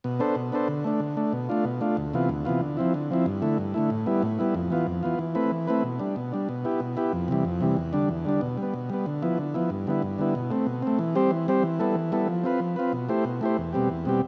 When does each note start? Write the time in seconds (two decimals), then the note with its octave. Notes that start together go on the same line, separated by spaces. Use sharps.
0.04 B2
0.19 B3 D4 A4 C5
0.35 B2
0.52 B3 D4 A4 C5
0.68 D3
0.84 A3 D4
1.00 D3
1.17 A3 D4
1.33 B2
1.49 A3 D4 F4
1.64 B2
1.81 A3 D4 F4
1.97 D2
2.14 C3 E3 B3 F4
2.29 D2
2.45 C3 E3 B3 F4
2.61 D3
2.77 F3 C4 E4
2.94 D3
3.10 F3 C4 E4
3.26 G2
3.42 D3 A3 E4
3.58 G2
3.74 D3 A3 E4
3.90 A2
4.06 G3 B3 E4
4.23 A2
4.39 G3 B3 E4
4.54 F2
4.70 E3 B3 F4
4.87 F2
5.03 E3 B3 F4
5.19 E3
5.35 A3 C4 E4 B4
5.51 E3
5.67 A3 C4 E4 B4
5.83 B2
5.99 G3 D4
6.16 B2
6.32 G3 D4
6.49 B2
6.65 B3 E4 G4
6.80 B2
6.97 B3 E4 G4
7.13 F2
7.28 C3 E3 G3
7.45 F2
7.61 C3 E3 G3
7.77 E2
7.93 D3 G3 D4
8.09 E2
8.25 D3 G3 D4
8.41 B2
8.57 G3 B3
8.74 B2
8.90 G3 B3
9.06 D3
9.22 F3 B3 E4
9.38 D3
9.54 F3 B3 E4
9.70 G2
9.87 D3 G3 B3 E4
10.02 G2
10.18 D3 G3 B3 E4
10.35 B2
10.50 A3 C4
10.67 B2
10.82 A3 C4
10.99 E3
11.15 G3 C4 G4 C5
11.31 E3
11.48 G3 C4 G4 C5
11.63 E3
11.80 G3 B3 E4 A4
11.95 E3
12.12 G3 B3 E4 A4
12.28 F3
12.44 C4 F4 B4
12.60 F3
12.76 C4 F4 B4
12.93 B2
13.09 A3 E4 G4 C5
13.25 B2
13.41 A3 E4 G4 C5
13.57 E2
13.73 B2 G3 C4 G4
13.90 E2
14.05 B2 G3 C4 G4